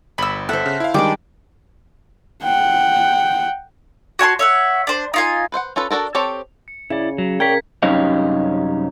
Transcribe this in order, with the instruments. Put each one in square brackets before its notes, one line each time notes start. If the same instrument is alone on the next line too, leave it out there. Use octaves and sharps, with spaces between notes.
[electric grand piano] G1 [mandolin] B5 E6
[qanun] A4 C5 [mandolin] E5 F#5
[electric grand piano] C#3
E4 F5
[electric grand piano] D#3 [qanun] G3 G#3 D4 [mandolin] D6
[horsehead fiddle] F#5 G5
[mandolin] F#4 C#5 A5 C6
C#5 E5 F#5
D4 C5
D#4 F4 G#5
[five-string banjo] B4 C5 F5 F#5
C#4 F4 A4 B4
D4 F#4 A4 A#4
C4 G4 A4 C#5 A5
[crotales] C#7
[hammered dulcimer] C#3 [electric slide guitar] E4 D5
[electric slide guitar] F#3
[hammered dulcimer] A#4 [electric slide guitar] C#5 D5 G5 [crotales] G#6 B6
[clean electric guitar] C2 F#2 C#4 D#4 G4 F5